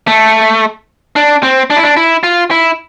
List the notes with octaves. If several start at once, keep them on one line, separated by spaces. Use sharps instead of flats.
A3
D4
C4
D4
E4
D4
E4
F4
E4